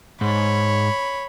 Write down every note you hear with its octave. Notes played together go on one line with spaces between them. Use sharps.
G#2 C#5 B5